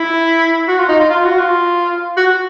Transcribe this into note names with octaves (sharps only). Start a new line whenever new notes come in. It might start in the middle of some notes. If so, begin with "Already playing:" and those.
Already playing: E4
F#4
F4
D#4
F4
F4
F#4
F4
F#4